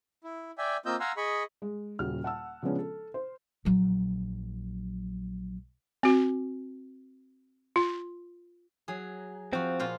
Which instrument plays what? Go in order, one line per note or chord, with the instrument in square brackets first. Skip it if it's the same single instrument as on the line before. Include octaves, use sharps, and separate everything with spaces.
[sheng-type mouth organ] E4
D5 E5 G5 G#5
A#3 C4 F4 D#5 E6 G6
F5 F#5 G#5 A#5 C6 E6
G#4 D#5 B5 C#6
[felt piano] G#3
D#1 C#3 F#4 F6
F#5 A5 E6
C#3 F3 G#3 B3 C#4 D4
A4
C5
[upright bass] A#1 F#3
[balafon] C4 F#4
F4
[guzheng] F#3 G#4
[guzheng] F3 F#4 [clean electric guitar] C4
[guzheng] A#2 F4 C5